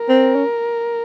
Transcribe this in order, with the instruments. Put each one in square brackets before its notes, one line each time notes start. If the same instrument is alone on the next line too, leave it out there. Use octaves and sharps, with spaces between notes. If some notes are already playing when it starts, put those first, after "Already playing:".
Already playing: [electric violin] A#4
[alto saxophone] C4
C#4